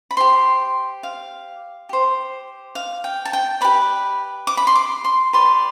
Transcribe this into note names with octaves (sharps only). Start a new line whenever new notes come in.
B5
G4 C5 C6
F5
G4 C5
F5
G5
A5
G5
G4 B4 D5 B5
D6
B5
C6
D6
C6
G4 B4 D5 C6